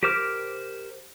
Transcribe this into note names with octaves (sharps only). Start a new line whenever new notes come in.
G4 A#4 C5 D6 F6